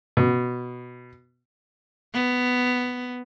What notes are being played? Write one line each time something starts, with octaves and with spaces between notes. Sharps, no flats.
B2
B3